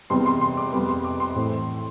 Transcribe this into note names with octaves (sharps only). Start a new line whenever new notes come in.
E2 C3 G3 B3 C6
C6
C6
D6
F2 C3 G3 B3 C6
C6
D6
C6
A2 E3 A3 C4